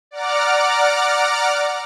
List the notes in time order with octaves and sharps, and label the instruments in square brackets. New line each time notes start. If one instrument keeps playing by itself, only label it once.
[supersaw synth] D5 F#5 A#5 D6 F6